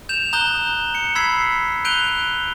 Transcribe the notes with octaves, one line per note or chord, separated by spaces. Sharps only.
G6 E7 F7
A#5 D#6 F#6 G6 E7 G7
C#7
B5 E6 G#6 B6 C7
F#6 G6 D7 D#7 F7 G7